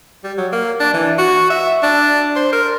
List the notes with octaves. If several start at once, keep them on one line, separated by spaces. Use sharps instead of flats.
G3
F#3
A#3
D4
E3
F#4
E5
D4
C5
A#4